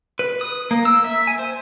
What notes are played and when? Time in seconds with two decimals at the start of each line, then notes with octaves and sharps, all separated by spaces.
0.19 B4
0.41 D#6
0.71 A#3
0.85 E6
1.04 E5
1.27 G#5
1.39 C5